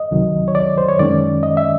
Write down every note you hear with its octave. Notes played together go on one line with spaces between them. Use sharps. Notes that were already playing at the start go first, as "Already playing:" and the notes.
Already playing: D#5
C#2 C3 D#3 F#3
C#5
D5
C5
C#5
F#2 D#3 G#3 C#4 D5
D#5
E5